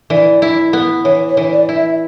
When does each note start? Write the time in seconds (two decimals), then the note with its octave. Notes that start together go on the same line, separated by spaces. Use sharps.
0.10 E3 D5
0.42 E4
0.73 B3
1.05 E3 C#5
1.29 C#5
1.37 E3
1.53 D5
1.69 E4
1.76 E5